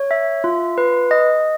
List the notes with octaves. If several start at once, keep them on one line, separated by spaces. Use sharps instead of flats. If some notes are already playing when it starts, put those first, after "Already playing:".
Already playing: C#5
E5
F4
B4
D#5